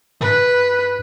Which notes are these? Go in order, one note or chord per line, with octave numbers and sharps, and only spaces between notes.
G2 B4